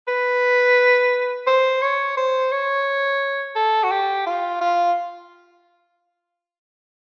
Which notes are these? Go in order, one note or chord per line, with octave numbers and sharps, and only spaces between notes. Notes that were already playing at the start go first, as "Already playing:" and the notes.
B4
C5
C#5
C5
C#5
A4
F#4
G4
F4
F4